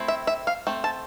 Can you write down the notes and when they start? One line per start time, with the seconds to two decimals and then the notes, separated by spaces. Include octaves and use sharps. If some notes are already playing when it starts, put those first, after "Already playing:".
Already playing: A3 C4 E4
0.08 E5
0.27 E5
0.47 F5
0.67 A3 C4
0.84 A5